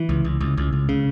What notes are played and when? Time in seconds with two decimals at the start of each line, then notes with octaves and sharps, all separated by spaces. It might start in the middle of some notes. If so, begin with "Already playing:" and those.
Already playing: E3
0.09 C#2
0.24 C#2
0.41 C#2
0.58 C#2
0.73 C#2
0.89 C#3